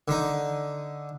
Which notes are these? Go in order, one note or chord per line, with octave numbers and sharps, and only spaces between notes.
D3 D#4